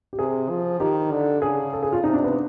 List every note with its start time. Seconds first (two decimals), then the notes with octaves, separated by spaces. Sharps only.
0.13 G4
0.19 C3 G#4
0.49 F3
0.80 D#3 G4
1.11 D3
1.42 C#3 G#4
1.73 A4
1.83 G#4
1.92 F4
2.04 C3 D#4
2.14 D4
2.24 B3